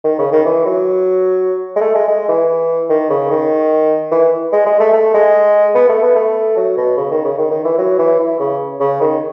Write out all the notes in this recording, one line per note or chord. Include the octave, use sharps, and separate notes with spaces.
D#3
C#3
D#3
E3
F#3
G#3
A3
G#3
G#3
E3
D#3
C#3
D#3
E3
G#3
G#3
A3
A3
G#3
B3
A3
B3
A3
F#3
B2
C#3
D#3
C#3
D#3
D#3
E3
F#3
E3
E3
C#3
C#3
D#3